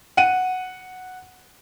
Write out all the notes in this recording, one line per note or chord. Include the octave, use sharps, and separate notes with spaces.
F#5 D#7